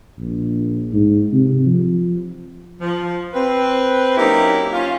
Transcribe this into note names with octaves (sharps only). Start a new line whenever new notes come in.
A#1
G#2
C3
F3
F3
C4 B4
F#3 A#3 C#4 D#4 E4 G4
C#4 F4